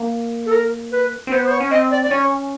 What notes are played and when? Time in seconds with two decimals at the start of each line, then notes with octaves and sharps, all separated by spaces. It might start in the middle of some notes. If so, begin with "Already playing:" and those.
Already playing: A#3
0.46 A4
0.52 A#4
0.92 B4
1.27 C4
1.31 B3 C5
1.46 C5
1.51 C#5
1.60 C#4
1.71 C4 D#5
1.91 D5
2.03 D5
2.11 C#4 C#5